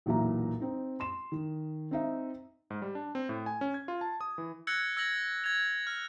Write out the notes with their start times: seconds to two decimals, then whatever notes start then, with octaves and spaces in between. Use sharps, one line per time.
0.06 B1 E2 A#2 E5 A#5
0.60 C4 D#4
1.00 C6 E7
1.32 D#3
1.91 C4 D#4 E5
2.70 G#2
2.82 G3
2.95 D4
3.15 C4
3.29 A2
3.46 G#5
3.61 C#4
3.74 G#6
3.88 F4
4.01 A5
4.21 D#6
4.38 E3
4.67 E6 F#6 G#6 A#6 C#7 F#7
4.97 E6 G#6 A#6 F#7
5.44 G#6 F7
5.87 F6